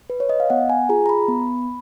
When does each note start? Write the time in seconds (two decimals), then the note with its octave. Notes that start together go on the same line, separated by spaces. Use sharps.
0.10 B4
0.20 C#5
0.29 D#5
0.40 F5
0.50 B3 F#5
0.69 G#5
0.89 F4 G#4 A#5
1.06 A#5
1.09 B5
1.28 B3